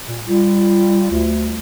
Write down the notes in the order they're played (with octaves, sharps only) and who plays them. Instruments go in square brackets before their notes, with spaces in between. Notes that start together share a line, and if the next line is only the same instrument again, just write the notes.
[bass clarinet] A#2
[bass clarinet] G3 [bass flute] F4
[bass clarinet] D2